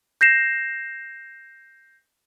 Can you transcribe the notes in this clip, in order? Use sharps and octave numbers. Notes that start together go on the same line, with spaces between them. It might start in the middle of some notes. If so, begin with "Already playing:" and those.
G6 A#6 C7 E7